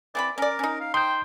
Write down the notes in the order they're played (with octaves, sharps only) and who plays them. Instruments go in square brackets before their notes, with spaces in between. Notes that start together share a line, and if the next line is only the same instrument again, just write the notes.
[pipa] E3 C4 B5 [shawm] D5
[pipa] C#4 D5 [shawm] A#4
[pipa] C#4 D#4
[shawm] F5
[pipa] D#4 [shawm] G5 [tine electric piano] C6 G6